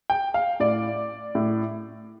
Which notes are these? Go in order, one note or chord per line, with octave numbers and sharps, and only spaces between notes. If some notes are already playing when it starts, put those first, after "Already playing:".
G5
F5
A2 D5
A2